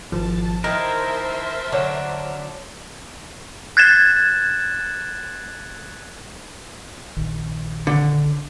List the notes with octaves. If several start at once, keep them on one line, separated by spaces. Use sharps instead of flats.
G#1 F3 A5
D#3 E4 A#4 C5 D#5 E5 A5
D3 F#3 D4 C#5
F#6 G#6 A6 E7
A#1 D#3
D3